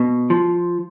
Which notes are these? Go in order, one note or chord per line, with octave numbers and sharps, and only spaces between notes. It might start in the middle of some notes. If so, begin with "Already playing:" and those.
Already playing: B2
F3